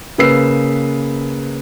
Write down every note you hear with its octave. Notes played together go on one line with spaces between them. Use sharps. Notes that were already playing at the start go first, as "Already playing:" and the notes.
C#3 A#3 B4 E6 C7